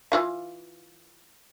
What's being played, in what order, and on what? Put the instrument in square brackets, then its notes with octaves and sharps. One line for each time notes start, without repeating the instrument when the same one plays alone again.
[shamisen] E3 F4 F5